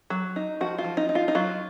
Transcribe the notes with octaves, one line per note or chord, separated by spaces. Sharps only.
F#3
D#4
F3 F#4
F4
F3
D#4
D#4
F4
D#4
F#3 F4